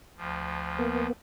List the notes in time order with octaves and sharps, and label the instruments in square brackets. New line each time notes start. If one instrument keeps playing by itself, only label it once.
[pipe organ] D2 F3
[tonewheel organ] A#3 B3